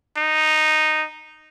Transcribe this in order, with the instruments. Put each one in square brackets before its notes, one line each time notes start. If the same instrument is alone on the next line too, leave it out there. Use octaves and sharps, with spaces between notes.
[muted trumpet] D#4